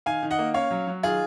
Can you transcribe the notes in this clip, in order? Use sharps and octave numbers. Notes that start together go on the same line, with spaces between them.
D#3 F5 G#5
D#3
D#5 F#5
A#3
C#4 C#5 F5
F#3
F#3
D#3 F4 G#4